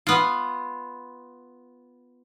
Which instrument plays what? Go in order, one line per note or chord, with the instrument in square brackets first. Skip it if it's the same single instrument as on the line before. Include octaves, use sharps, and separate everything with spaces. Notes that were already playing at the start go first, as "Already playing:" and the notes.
[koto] B3 F4